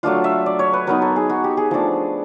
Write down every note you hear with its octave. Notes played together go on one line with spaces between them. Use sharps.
F#3 A3 D4 F4 F5
E5
D5
C#5
B4
F#3 B3 D#4 A#4
A4
G#4
F#4
G4
G#4
F3 A3 D4